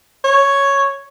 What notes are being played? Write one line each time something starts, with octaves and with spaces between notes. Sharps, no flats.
C#5